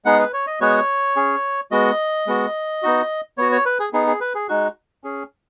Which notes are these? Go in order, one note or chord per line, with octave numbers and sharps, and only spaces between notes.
G#3 B3 D#4 G#4 F#5
B4
C#5
D#5
G#3 B3 F#4 C#5
C#4 G#4
G#3 B3 F#4 D#5
G#3 B3 F#4
B3 D#4 F#4
B3 F#4 C#5
C#5
B4
G#4
B3 D#4 G#4
G#4
B4
G#4
G#3 D#4 F#4
C#4 G#4